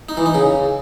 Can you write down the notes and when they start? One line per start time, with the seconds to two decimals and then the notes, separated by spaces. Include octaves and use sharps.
0.09 D#4
0.17 E3
0.26 D#4
0.34 C#3